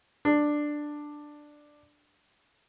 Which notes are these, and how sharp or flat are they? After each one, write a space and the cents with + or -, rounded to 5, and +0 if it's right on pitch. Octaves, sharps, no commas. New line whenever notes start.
D4 +10